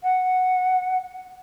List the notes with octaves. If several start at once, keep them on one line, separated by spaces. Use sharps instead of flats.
F#5